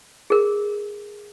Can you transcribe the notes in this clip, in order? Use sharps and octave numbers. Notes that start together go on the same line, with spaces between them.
G#4 A#4